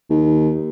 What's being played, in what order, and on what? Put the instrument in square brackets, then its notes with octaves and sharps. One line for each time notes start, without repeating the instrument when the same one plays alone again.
[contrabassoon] D#2